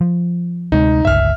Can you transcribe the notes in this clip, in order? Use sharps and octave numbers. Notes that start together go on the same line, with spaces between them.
F3
D2 C3 G#3 D#4
G1 C#2 E5 F6